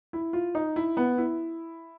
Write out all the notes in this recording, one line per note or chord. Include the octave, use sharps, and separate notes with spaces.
E4
F4
D#4
E4
B3
E4